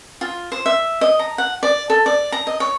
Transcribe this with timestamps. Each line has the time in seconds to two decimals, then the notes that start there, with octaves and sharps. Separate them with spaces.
0.21 F4
0.52 C5
0.66 E5
1.01 D#5
1.19 A#5
1.38 F#5
1.63 D5
1.90 A4
2.06 D5
2.32 A#5
2.47 D#5
2.60 C#5